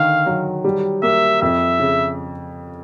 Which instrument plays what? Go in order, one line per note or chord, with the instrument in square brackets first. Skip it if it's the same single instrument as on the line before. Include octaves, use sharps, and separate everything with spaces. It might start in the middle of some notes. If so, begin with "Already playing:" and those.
Already playing: [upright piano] D3 D#3 [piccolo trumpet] F5
[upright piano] F#3
G3
[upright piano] A#3 [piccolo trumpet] E5
[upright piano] F2 [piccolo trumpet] E5
[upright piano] C#3